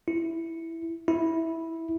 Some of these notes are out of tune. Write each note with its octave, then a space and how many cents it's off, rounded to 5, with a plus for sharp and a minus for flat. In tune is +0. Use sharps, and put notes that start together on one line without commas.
E4 +0
E4 -10